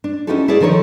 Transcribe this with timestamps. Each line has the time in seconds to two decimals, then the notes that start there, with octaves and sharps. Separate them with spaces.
0.04 D4
0.27 C#4 D#4 E4 F#4 G4 A4
0.48 E4 G#4 C#5 D5
0.61 D3 D#3 F3 A#4 B4 C#5